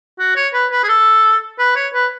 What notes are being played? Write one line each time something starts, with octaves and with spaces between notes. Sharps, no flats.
F#4
C#5
B4
B4
G#4
A4
B4
C#5
B4